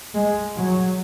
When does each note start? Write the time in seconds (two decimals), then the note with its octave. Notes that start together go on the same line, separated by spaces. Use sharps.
0.15 G#3
0.57 F#3